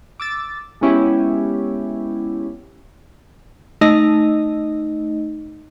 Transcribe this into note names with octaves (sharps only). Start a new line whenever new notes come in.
D6 E6 A6
G#3 B3 C#4 E4 G4
A3 D#4 D#5